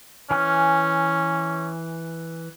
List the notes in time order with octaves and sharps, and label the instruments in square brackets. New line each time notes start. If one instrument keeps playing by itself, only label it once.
[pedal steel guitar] E3 G#5 F6 [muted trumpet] C#4